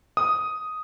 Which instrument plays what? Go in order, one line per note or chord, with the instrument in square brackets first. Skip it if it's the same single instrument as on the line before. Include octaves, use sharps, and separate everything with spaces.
[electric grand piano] D#6